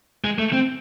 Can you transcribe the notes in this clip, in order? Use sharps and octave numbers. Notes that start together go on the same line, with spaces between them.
G#3
A3
C4